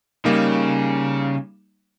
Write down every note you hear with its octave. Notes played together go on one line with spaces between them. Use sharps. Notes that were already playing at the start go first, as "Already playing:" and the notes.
C#3 G3 A#3 D#4